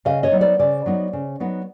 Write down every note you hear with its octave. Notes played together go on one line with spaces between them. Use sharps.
C#3 D#5 F5
C#5 D#5
F#3 B3 D#4
C5 D5
C#3 C5 D5
F#3 B3 D#4
C#3
F#3 B3 D#4